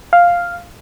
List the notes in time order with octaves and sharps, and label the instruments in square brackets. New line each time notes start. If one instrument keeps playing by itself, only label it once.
[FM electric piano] F5